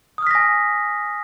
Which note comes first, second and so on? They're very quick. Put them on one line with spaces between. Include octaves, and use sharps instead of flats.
D#6 F6 B6 A#6 G#5